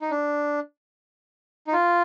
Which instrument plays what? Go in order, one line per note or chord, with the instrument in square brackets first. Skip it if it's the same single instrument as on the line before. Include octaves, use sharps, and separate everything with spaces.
[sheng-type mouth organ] D#4
D4
D#4
F4